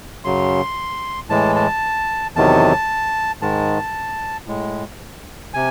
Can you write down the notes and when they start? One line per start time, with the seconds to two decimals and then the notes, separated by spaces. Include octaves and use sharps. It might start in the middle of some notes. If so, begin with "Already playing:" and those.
0.25 F#2 C#3 F#3 C6
1.29 A2 E3 G#3 A5
1.56 A5
2.36 E2 C3 D#3 F#3 A5
3.42 G#2 D#3 G#3 A5
4.47 A2 G#3
5.54 C3 G#5